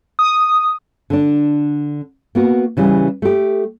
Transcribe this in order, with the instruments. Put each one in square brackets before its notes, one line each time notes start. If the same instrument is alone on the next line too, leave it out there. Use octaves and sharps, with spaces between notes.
[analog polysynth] D#6
[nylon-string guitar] D3 D4
A#3 B3 F#4
C#3 E3 G3
A3 G4